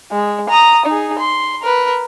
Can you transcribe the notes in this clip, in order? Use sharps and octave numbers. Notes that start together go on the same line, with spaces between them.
G#3
A#5 D#6
D#4 G#4
C6
A#4 B4